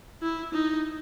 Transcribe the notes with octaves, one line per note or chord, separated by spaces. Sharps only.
E4
D#4